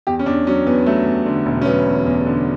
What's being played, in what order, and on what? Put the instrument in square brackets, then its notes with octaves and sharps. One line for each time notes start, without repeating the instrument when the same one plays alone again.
[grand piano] E2 G4
C#4
E2 D4
F#3 C#4
E2 B3
F#3 A3
E2
D3
E1
C#4
F#3 B3
E2
E2
D3